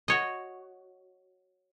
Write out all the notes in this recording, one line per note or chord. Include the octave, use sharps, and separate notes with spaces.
F#4 C#5 D#5